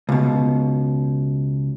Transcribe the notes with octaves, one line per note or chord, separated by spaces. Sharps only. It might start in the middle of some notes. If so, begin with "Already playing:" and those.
C#2 B2